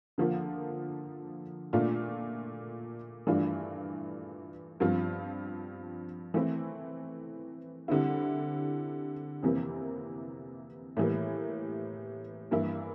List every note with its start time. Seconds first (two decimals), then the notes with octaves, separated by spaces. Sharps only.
0.18 D3 F3 A#3 F4
1.73 A#2 A3 D4 F4
3.27 G2 E3 A3 D4 F4
4.80 G2 F3 C4 F4
6.34 E3 A3 C4 E4
7.88 D3 G3 C4 E4
9.43 F2 C3 E3 A#3
10.97 A2 E3 G3 A#3
12.51 G2 E3 A#3 E4